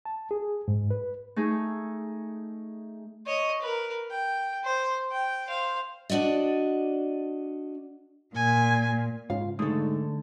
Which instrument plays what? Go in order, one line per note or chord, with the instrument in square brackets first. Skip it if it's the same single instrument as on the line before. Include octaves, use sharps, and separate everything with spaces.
[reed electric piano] A5
G#4
G#2
B4
[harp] A3 D#4 G#4
[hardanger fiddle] C#5 D#5
A#4 B4
G5
C5
G5
C5 F5
[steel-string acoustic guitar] D4 F#4 D5 D#5
[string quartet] A#2 [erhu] G#5
[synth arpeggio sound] G#2 C#3 F4 [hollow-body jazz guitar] F5
[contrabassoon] G#2 [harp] D3 [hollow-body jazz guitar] A3 A4 [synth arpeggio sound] D#6